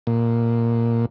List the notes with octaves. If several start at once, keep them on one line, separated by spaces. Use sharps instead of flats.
A#2